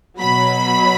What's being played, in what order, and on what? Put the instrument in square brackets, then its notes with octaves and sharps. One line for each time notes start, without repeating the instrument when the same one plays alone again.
[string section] B2 F#3 B5